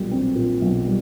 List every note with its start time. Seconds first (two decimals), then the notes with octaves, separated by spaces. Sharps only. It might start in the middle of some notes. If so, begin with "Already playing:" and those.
Already playing: B1 A#2 G3
0.11 C4
0.35 A#2
0.62 B1
0.86 G3